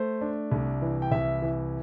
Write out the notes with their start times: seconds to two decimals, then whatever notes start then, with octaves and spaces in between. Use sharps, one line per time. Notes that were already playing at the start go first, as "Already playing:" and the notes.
Already playing: A3 C5
0.21 D4
0.52 C2
0.82 E3
1.02 G5
1.11 C2 E5
1.42 E3